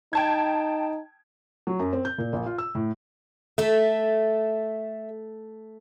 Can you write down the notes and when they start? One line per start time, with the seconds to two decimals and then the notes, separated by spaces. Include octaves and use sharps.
0.13 D#4 G5 A5 G#6
1.67 F#3
1.79 F#2
1.93 C4
2.05 G6
2.18 A#2
2.33 A#1
2.46 F4
2.58 E6
2.75 A2
3.58 A3 A4 E5